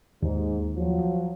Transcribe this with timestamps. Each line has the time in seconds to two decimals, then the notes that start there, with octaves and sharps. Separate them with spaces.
0.23 D#2 G#2
0.77 F3 F#3